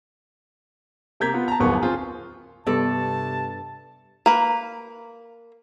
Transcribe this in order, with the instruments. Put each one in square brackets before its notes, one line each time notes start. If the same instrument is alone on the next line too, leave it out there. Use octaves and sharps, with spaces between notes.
[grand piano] C3 A#3 A#5 G6 G#6 B6
B3 F4
A5 A#5
D1 G1 D#2 A#3 B3 C#6
C4 F4 G#4
[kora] G2 A4 D5 [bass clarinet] C3 [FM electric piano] B3 [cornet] A5
[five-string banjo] A#3 B4